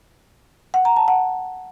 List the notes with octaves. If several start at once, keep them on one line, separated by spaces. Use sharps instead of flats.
F#5
A#5
A5
F#5